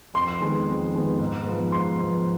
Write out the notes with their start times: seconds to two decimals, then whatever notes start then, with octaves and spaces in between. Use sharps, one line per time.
0.14 F2 C6
0.40 D#3 G#3 B3
0.67 F2
0.94 D#3 G#3 B3
1.19 G#2
1.46 F3 B3
1.72 G#2 C6
1.99 F3 B3